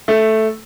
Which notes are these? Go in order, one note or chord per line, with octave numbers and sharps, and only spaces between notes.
A3